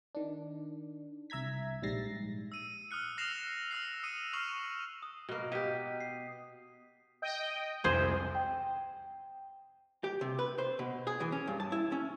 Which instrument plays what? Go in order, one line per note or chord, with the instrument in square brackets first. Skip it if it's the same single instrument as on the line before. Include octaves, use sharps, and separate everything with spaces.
[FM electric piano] D#3 D4
C2 E5 A#5 G#6 B6
A#1 G#2 G3 A6 A#6 C7
[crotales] E6 D#7
D#6 F6 F#6 C#7
E6 F6 A#6 C7 E7 F7
E6 F6 C7
D#6 C#7 D#7 E7
C#6 D#6 F6 C7 E7 F#7
[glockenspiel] D#6
[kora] B2 A#3
[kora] B2 G4 [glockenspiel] D#6 B6 D#7
[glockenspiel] C7
[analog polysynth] D#5 G5 G6
[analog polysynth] C2 F2 C3 [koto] G#4 C5
[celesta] G5
[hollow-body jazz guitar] G4
C3
B4
C5
B2
G#4
E3
C#4
G2
A5
E4
C#4